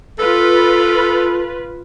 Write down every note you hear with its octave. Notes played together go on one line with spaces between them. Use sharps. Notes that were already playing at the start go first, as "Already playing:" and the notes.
F4 A4 B4